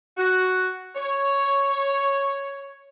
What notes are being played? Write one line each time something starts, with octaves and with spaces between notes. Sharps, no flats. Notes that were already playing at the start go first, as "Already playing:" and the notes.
F#4
C#5